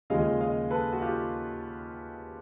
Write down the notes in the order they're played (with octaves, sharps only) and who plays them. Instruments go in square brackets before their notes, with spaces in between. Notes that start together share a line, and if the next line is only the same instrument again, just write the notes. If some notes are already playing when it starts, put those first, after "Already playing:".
[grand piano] D#2 C#3 F3 G#3 D#5 F5
D#5 F5
A4 B4
F#4
F4 G4